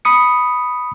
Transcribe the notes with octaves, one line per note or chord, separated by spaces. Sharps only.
B5 D#6 C#7